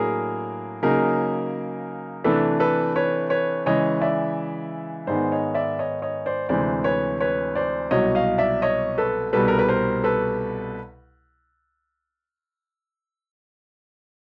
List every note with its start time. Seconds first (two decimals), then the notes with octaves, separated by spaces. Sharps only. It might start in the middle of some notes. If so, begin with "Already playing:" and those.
Already playing: A2 F#3 A#3 D4 G#4 A#4
0.82 C#3 F#3 A#3 D#4 G#4 A#4
2.24 C3 E3 A3 D4 A4 B4
2.60 A4 B4
2.95 B4 C#5
3.30 B4 C#5
3.66 C#3 E3 G#3 C#5 D#5
4.01 D5 E5
5.07 G#2 D#3 G#3 B3 C5 D5
5.32 C#5 D#5
5.55 D5 E5
5.79 C#5 D#5
6.02 C#5 D#5
6.26 C5 D5
6.49 D2 C3 E3 G#3 C5 D5
6.84 B4 C#5
7.21 B4 C#5
7.55 C5 D5
7.91 C2 B2 F#3 C#5 D#5
8.15 D#5 F5
8.38 D5 E5
8.62 C#5 D#5
8.98 A4 B4
9.33 C2 B2 G3 A4 B4
9.48 A#4
9.59 B4
9.68 A#4 C5
10.04 A4 B4